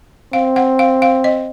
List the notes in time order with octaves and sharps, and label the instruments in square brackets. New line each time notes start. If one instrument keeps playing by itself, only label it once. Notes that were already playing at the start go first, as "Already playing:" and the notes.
[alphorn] C4 [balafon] F5
[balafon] F#5
F5
F5
D#5